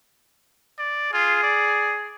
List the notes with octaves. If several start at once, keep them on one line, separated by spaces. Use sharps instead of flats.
D5
F4 G#4
D5